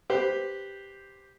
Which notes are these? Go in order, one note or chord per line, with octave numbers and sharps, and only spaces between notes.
G4 B4 C5